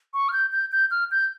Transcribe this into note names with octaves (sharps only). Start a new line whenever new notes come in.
C#6
F6
G6
G6
G6
F6
G6